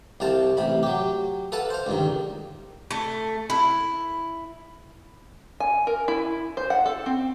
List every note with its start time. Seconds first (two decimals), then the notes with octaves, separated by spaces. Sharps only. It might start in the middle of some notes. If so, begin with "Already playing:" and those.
0.20 C2 C3 F5 A5
0.57 A1 C3 B5
0.83 F#3 G4
1.52 A4 B4 F5 F#5 A5
1.70 C5 F5
1.87 C#2 G2 D#3
2.91 A3
3.50 E4
5.60 G#5
5.87 A#4
6.08 E4
6.57 C5
6.70 F#5
6.86 A4
7.06 C4